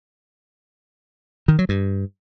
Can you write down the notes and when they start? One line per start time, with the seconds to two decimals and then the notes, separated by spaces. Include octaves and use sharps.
1.48 D#3
1.59 F#3
1.69 G2